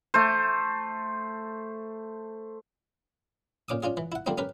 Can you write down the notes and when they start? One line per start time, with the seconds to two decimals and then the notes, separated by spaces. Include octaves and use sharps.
0.14 A3 C5
3.69 A#2 C#4 D6 D#6
3.83 C#4 D4 F4 G#4
3.97 E3
4.12 E4 F#5
4.26 D3 F3 G3 A#3 C4 D4
4.38 C#4 G4 A#4 B4